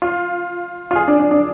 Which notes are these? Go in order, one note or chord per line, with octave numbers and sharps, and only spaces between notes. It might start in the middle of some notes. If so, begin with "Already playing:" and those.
F4
F4
G#4
D4
D4
D4